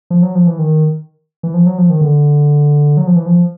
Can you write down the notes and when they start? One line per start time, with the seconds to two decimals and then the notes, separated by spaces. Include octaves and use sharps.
0.10 F3
0.22 F#3
0.35 F3
0.47 E3
0.59 D#3
1.43 E3
1.54 F3
1.66 F#3
1.78 F3
1.90 D#3
2.01 D3
2.97 F#3
3.07 F3
3.16 E3
3.26 F3